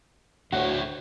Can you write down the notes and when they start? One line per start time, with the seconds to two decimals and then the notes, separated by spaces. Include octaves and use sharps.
0.52 D2 D3 A3 F#4 C#5